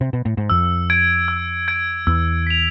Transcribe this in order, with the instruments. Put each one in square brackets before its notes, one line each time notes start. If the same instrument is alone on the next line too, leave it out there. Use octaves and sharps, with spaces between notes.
[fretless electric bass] C3
B2
A2
G#2
[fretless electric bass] F2 [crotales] E6
[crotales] G#6 D7
E6
G#6 D7
[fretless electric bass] E2 [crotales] E6
[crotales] B6 F7